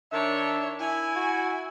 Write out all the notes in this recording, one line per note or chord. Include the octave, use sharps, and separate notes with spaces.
D#3 D4 C#5 E5
E4 G#5
F#4